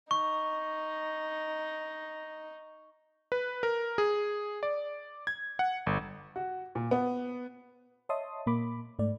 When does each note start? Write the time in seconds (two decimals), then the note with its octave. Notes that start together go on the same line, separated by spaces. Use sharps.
0.11 D#4 C#6
3.32 B4
3.63 A#4
3.98 G#4
4.63 D5
5.27 G#6
5.59 F#5
5.86 G1
6.36 F#4
6.75 A#2
6.91 B3
8.09 C#5 D#5 E5 A5 C6 D#6
8.46 A#2 A#3 B5 D6
8.99 G#2 A3 D5